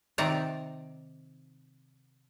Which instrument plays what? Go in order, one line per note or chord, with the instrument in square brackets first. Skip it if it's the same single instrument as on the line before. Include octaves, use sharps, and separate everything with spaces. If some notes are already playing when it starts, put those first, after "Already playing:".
[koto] C3 D#3 D5 A#5